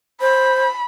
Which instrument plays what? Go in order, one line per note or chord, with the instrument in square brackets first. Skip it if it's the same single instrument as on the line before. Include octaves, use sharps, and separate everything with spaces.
[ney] C5 [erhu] B5